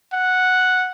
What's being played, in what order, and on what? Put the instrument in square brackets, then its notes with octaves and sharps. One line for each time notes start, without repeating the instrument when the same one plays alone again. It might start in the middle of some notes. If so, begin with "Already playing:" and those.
[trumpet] F#5